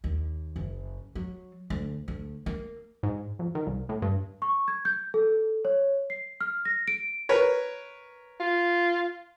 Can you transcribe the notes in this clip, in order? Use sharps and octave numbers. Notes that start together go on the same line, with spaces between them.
D#2
F#1
F#3
D2
D2
A#3
G#2
F2
D#3
C2
A2
G2
C#6
G#6
G6
A4
C#5
C7
F6
A#6
D7
A#4 B4 C#5
F4